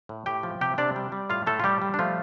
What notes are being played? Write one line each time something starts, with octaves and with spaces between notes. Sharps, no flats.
A2
A2 G4 G5
F3
C3 G4 G5
C3 D4 D5
G3
G3
A2 F4 F5
A2 A3 A4
F4
G3 G4
G3
D4
F3 A3 F4